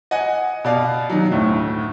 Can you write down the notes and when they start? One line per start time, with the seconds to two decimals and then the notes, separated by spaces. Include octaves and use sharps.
0.11 D#5 F#5 G#5
0.64 B2 D5 F5
1.10 D#3 F#3
1.32 D2 A2